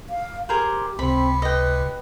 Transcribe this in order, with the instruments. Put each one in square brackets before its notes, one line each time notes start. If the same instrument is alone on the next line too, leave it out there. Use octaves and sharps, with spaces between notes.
[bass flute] F5
[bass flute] G4 [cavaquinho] G#4 A#4 C5
[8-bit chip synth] C#2 C3 [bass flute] C4 [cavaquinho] B5
[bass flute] B4 [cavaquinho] D#5 G5